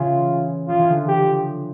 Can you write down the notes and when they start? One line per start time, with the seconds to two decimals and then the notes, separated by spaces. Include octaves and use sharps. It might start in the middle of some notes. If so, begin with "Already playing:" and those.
Already playing: C#3 E3 F4
0.68 F3 F4
0.79 E3
0.89 D3 F3
1.08 G4